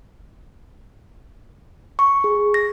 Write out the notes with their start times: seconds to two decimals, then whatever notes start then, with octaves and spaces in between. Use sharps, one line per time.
1.99 C#6
2.24 G#4
2.54 A#6